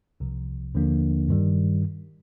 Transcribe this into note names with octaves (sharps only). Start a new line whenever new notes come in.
C2 C3 F3
D#2 D3 F3 A#3 D4
G2 D#3 G3